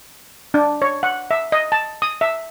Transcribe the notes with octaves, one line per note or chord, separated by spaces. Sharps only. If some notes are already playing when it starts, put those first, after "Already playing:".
D4
C#5
F#5
E5
D#5
A5
D#6
E5